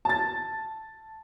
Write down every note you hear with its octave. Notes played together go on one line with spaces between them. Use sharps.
A5 A6